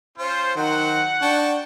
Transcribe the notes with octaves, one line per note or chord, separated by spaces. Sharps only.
C#4 F4 C5
D#3 F#3 C5 F#5
D4 F#4 G5 A5